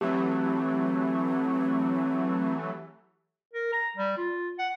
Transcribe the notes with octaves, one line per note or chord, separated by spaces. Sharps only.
E3 F#3 A3 C4 G4
A#4
A#5
G3
F4
F#5